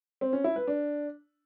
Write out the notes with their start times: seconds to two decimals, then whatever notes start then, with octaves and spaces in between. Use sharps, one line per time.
0.21 C4
0.33 C#4
0.44 E4
0.56 B4
0.67 D4